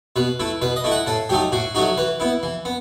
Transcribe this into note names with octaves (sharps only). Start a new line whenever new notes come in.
B2 B4
A3 E4
B2 B4
D#5
A3 E4
F#5
A2 A4
F#3 A3 D#4 G4
A2 F#4
F#3 A3 D#4 F#4
E3 B4
B3 E4
E3
B3